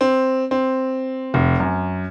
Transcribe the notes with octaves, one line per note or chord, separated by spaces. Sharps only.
C4
C4
F1
F#2